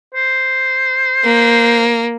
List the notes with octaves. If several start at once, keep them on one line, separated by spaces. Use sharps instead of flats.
C5
A#3